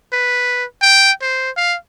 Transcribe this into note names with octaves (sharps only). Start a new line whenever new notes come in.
B4
G5
C5
F5